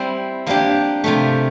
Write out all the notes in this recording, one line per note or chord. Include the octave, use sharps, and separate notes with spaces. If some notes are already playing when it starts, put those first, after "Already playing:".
Already playing: G3 C4 E4
F3 A#3 D4 G4
C3 F3 A3